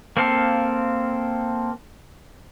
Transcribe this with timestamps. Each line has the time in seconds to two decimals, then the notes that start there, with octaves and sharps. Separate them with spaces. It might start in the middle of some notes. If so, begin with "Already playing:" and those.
0.17 A#3 C4 A4 F5